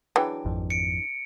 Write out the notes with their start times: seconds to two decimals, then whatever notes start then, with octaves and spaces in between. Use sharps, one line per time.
0.16 E3 F#3 D4 G#4 G5
0.45 G#1 F2
0.70 C#7 D7